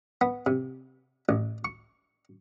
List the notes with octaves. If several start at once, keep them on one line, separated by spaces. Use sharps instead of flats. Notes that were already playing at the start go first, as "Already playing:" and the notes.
B3
C3
A1
C#6